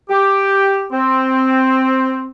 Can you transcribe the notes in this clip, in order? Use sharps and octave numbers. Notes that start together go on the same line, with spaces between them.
G4
C4